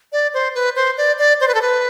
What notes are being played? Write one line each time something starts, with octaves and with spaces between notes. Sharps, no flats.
D5
C5
B4
C5
D5
D5
C5
B4
A4
B4